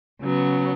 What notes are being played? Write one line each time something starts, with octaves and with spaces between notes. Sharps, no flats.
C#3 F#3 B3